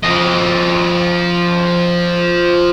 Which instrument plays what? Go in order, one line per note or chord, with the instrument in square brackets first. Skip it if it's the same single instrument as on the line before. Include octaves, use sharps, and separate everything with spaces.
[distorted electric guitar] F3 D#5